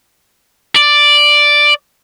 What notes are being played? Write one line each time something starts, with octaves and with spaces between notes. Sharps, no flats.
D5